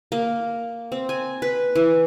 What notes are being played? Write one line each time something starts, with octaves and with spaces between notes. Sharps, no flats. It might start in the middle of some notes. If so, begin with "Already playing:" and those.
A#3
C4
G#5
B4
E3